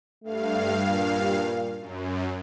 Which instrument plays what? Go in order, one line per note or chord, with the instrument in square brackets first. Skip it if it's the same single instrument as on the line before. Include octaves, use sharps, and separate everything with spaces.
[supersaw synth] G2 F5 [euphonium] A3
[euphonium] A#2
[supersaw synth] F#2